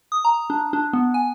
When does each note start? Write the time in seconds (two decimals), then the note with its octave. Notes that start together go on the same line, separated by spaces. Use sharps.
0.12 D#6
0.25 A#5
0.50 D4
0.73 D4
0.93 B3
1.14 G#5